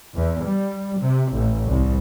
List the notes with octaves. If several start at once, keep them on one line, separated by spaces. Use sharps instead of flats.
E2
G3
C3
A1
C2